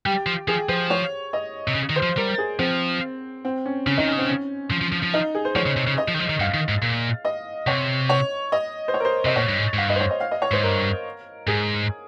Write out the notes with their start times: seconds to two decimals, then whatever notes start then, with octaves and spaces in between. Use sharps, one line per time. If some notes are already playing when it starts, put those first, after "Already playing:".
0.05 G3 G4
0.26 F3
0.48 F3 G#4
0.69 F3 C5
0.90 C#5
1.33 D#5
1.68 C3
1.75 C#3
1.90 D#3
1.96 C5
2.03 F3
2.17 G3 A#4
2.38 G#4
2.59 F3 C4
3.45 C4
3.66 C#4
3.87 C#3 C#4
3.97 D#3 D#4
4.07 C#4
4.13 C#3
4.18 C4
4.28 C#4
4.71 F3
4.81 F3
4.92 F3
5.03 F3
5.14 D#4
5.35 G#4
5.45 C5
5.56 F3 C#5
5.66 C#3
5.77 C3
5.87 C#3
5.98 D#5
6.08 F3
6.14 D#3
6.19 F3
6.29 D#3
6.40 G2 F5
6.54 D#3
6.69 G#2
6.82 A#2
7.25 D#5
7.67 C3 C#5
8.09 C#5
8.52 D#5
8.88 C5
8.94 C#5
9.00 A#4
9.05 C5
9.25 C3 D#5
9.36 A#2 C#5
9.49 G2
9.57 G#2
9.74 G#2
9.78 G2 F5
9.89 D#5
9.96 C5
10.00 C#5
10.10 D#5
10.20 F5
10.31 D#5
10.42 C#5
10.51 G#2 C5
10.63 G2 A#4
11.47 G#2 G#4